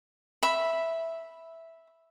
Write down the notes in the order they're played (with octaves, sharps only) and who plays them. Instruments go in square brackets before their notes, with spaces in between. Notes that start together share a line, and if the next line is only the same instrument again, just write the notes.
[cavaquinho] E5 B5